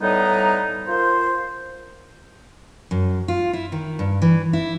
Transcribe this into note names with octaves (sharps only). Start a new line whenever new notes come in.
A2 G3 B3 D#4 A#5
F4 A#4 C5
F#2
F4
E4
D#3
G2
E3
E4